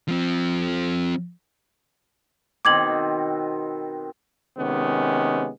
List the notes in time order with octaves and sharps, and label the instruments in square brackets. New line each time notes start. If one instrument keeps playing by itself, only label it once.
[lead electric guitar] F3 C4
[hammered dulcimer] B2 D#3 C4 [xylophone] D6 G#6 F#7
[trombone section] C3 D#3 G#3 B3 C#4